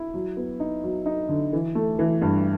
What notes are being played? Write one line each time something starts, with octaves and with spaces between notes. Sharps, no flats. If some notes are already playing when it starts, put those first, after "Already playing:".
Already playing: E4
F#3
B3
D#4
F#3
D#4
D3
E3
A3
E3
G2